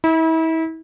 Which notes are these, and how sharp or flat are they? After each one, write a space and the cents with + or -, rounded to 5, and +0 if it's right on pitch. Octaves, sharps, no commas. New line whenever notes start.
E4 -35